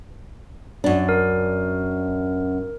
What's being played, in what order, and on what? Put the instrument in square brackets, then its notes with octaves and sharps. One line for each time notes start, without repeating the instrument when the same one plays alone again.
[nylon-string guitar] F#2 D4
[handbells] A#4